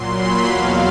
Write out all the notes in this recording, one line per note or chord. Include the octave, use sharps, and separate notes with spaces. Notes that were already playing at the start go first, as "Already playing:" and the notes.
Already playing: A#2 F#3 C6
B5
E2 B2 F#3 F5